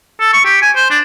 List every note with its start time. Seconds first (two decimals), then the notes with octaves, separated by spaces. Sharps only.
0.20 A4
0.33 C#6
0.45 G4
0.62 G#5
0.76 C5
0.90 D4